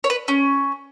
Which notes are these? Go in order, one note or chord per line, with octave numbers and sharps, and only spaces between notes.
C#5
B4
C#4